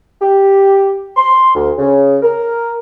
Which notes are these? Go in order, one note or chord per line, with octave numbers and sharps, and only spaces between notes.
G4
C6
D2
C#3
A#4